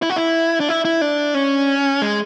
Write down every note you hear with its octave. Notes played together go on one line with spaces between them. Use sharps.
E4
F#4
E4
D4
E4
E4
D4
C#4
G#3